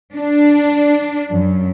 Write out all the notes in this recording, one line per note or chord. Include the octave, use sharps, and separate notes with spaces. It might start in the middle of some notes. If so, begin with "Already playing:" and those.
D4
F#2